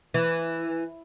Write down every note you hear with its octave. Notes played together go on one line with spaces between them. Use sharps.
E3